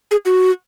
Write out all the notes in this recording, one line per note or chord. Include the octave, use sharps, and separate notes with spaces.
G#4
F#4